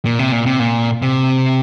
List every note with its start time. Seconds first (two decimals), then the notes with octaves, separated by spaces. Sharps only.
0.05 A#2
0.19 C3
0.32 A#2
0.46 C3
0.60 A#2
1.02 C3